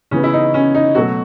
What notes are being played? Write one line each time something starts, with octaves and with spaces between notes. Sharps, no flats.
C#3 E3 B3 C#4
E4
D#4
C#4
D#4
B2 F#3 A3 F#4